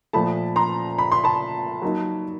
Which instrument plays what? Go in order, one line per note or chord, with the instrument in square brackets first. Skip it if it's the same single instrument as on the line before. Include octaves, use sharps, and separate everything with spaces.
[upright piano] A#2 F3 A3 A5 B5
A#5 C6
B5
C6
A5 B5
F#3 A#3 D#4